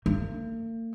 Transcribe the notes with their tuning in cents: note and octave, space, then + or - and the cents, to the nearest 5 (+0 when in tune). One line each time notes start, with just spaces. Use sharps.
A#3 -45